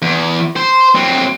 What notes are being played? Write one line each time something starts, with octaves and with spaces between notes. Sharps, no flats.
E2
C5
F#3 C4